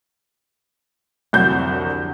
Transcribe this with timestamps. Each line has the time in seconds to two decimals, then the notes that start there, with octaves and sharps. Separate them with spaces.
1.33 C2 F2 D3 F#3 F#4 G6